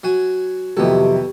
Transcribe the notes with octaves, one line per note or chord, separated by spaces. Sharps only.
F#3 F#4 G#5
F2 C3 D#3 F#3 B3 G4 A4